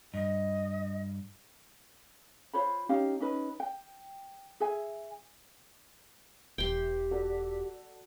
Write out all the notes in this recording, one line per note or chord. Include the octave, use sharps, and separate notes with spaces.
G2 D#5
F4 C5 C#5 B5
C#4 D#4 G4 F5
C#4 D#4 B4
G5
G#4 E5 G#5
E1 E3 G4 G5 C6
F#4 A4 D5